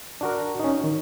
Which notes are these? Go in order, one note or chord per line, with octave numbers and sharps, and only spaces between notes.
D4 F#4 A#4
C#4 D#4
D#3